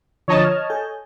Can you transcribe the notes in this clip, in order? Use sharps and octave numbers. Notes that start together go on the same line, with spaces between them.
D3 F3 C#5 D#5 A5 A#5
F6 G#6
A4 G#5 G6